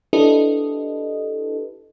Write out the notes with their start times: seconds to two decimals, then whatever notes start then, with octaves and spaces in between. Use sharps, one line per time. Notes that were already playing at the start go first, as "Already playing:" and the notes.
0.13 D4 E4 G4 A4 B4 D#5